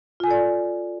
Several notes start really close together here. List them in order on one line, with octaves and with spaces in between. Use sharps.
F4 G#5 A4 D5